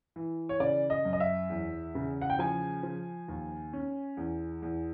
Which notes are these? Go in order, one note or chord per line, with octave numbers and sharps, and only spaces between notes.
E3
C#5
C#3 D5
D#5
F#2
D#5
E5
E2
C#3
F#5
G5
F3 G#5
F3
D#2
C#4
E2
E2